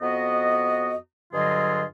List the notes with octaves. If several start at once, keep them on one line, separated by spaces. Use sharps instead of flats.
F2 B3 F#4 D#5
G2 D3 F#3 F4 G#4 D#5